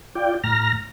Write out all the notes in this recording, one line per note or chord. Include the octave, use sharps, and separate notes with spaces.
F4 D5 G5
A2 A#5 F6 A#6